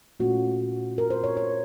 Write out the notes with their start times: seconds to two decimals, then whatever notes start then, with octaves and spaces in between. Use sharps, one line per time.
0.20 A#2 A3 C#4 F4 F#4
0.98 A#4
1.10 C5
1.24 C#5
1.37 C#5